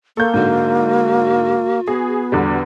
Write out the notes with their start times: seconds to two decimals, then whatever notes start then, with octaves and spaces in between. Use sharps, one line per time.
0.17 A#3 A4 C#6 G6
0.34 G#2 D3 F#4
1.88 B3 G#4
2.32 E2 D3 G3